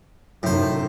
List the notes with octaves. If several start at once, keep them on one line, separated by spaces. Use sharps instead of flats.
F#2 A2 C3 D#3 C5